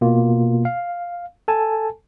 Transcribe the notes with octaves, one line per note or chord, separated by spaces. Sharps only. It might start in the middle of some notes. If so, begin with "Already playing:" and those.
B2 A#3 F4
F5
A4 G#5 A5